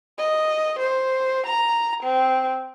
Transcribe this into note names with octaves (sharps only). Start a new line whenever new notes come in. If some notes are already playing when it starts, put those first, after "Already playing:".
D#5
C5
A#5
C4